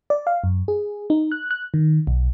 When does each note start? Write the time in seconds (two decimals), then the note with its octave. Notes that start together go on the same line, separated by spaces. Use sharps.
0.10 D5
0.27 F5
0.44 F#2
0.68 G#4
1.10 D#4
1.32 F#6
1.51 F#6
1.74 D#3
2.07 B1